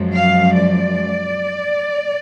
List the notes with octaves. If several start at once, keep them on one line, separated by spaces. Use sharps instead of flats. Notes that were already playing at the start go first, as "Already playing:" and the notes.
Already playing: F#2 F3 G#3
F5
D5